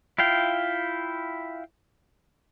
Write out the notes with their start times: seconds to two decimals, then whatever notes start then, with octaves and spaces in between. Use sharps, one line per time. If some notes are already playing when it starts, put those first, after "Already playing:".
0.18 E4 F4 F5 G5